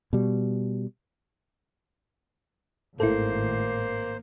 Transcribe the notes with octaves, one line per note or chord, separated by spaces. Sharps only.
B2 G3
G#1 A2 A#3 E4 A4 C5